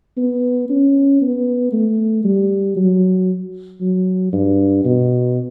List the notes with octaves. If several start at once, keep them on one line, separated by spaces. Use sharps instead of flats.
B3
C#4
B3
A3
G3
F#3
F#3
G2
B2